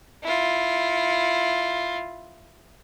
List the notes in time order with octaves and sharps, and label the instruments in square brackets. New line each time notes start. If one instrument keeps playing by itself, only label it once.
[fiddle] E4 F4